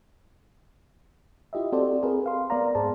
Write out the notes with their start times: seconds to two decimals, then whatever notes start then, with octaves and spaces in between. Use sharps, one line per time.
1.53 E4 F4 G4 D#5 E5
1.72 C4 F#4 G4 A4 C5 D5
2.03 C4 G#4 A#4 B4
2.26 F5 C6
2.50 B3 A#4 D5 F5 A#5
2.75 G#2 G#4 C5 D5 A5